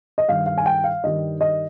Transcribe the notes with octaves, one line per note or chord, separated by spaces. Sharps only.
D#5
G2 D#3 G3 F5
F5
G#5
G5
F5
G2 D#3 G3 D#5
D#5